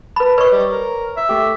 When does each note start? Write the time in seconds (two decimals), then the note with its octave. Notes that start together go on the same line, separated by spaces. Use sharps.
0.16 B4 A5 B5
0.38 B4 C#5 D#5 C#6
0.52 G3
0.71 A#4
1.17 E5
1.29 A3 G4